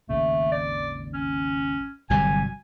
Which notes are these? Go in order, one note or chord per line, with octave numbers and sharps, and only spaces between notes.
G#1 D#2 C#3 A3
D5
C#4
G1 C3 F#3 G3 G#5